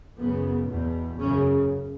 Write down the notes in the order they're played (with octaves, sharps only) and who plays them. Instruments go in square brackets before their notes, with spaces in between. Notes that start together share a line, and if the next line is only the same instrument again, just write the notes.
[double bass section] F#2 C#3 B3
E2 B2
F#2 C#3 C#4